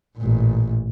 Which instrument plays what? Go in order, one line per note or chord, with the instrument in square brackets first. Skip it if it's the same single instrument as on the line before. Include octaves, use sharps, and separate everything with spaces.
[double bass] A1 A#2